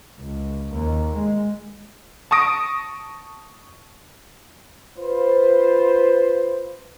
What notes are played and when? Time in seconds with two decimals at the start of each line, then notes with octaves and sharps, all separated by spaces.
0.19 C#2
0.73 D#2
1.16 G#3
2.31 A5 C#6 D#6 A#6 D7
4.98 F4 B4 C5